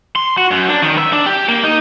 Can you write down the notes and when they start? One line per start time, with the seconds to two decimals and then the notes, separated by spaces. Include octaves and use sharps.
0.16 C6
0.38 F#4
0.51 F#2
0.69 D4
0.82 D#3
0.98 E5
1.13 D4
1.26 G4
1.48 A#3
1.64 D#4